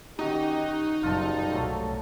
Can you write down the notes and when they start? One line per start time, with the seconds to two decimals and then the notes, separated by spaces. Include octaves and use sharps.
0.19 D#3 C#4 D#4 F#4 G4 D#5
1.03 F#1 G3 F4 A4
1.53 C2 G#2 F#3 A3